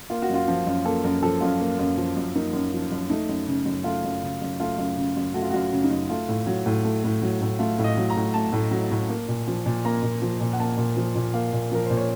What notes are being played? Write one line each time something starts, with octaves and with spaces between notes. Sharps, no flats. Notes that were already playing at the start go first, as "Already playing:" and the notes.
A#3 F4
F#4
F#2 F4
F3
F#2
A#3 A4
F#2 A#4
F3 A4
F#2 F4
A#3
F#2
F3
F#2
A#3 D#4
F#2
F3
F#2
A3 D#4
F#2
C#3
F#2
A3 F4
F#2
C#3
F#2
A3 F4
F#2
C#3
F#2
A3 F#4
F4
F#2 F#4
C#3
D#4
F#2
A3 F4
A2
F#3
A2
A3
A2
F#3
A2
A3 F4
A2
D#5
F#3
A#5
A2
A3 A5
A2
F#3
A2
A#3
A#2
F3
A#2
A#3 A#5
A#2
F3
A#2
F#5
A#3 A5
A#2
F3
A#2
A#3 F5
A#2
F3 A#4
A#2 C5
C#5